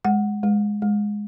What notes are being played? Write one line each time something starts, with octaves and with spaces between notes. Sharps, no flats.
G#3 F#5
G#3
G#3